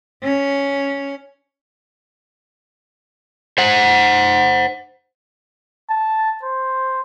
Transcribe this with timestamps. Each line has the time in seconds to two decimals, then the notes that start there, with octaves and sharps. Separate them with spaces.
0.23 C#4
3.58 C5 F#5
5.90 A5
6.43 C5